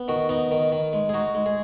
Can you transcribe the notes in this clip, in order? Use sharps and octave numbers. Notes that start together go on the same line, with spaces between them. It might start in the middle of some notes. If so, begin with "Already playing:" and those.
Already playing: B3
D#3 F#4
B3 D#4
D#3
D#3
G#3
G#4
D#4 F#4
G#3
G#4